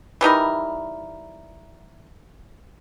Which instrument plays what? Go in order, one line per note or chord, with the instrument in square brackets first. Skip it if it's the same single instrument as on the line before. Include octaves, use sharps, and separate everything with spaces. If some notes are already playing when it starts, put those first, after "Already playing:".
[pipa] E3 G3 D#4 A#4